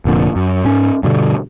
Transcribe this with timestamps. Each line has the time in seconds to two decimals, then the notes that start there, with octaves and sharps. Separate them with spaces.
0.05 F1 A#2 D3 F3
0.36 F#2
0.65 G#2 C#4
1.03 G2 B2 D3